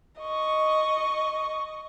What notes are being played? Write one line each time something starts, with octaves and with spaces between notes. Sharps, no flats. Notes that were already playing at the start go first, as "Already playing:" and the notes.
D#5 C#6